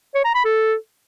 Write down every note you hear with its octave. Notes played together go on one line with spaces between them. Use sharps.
C#5
A#5
B5
A4